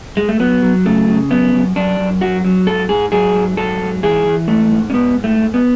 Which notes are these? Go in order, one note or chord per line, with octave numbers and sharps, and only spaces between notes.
G#3
A3
F#3 B3
F#3
C#3 A3
C#3
F#2 B3
F#2
F#2 D4
F#2
F#3 F#4
F#3
G#2 A4
G#2 G#4
F#3 G#4
G#2
F#3 A4
G#2
E3 G#4
E3
G#2 A3
G#2
C#4
G#2 B3
G#2
A3
G#2
B3